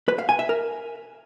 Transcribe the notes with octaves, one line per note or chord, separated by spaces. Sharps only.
B4
F5
G#5
E5
A#4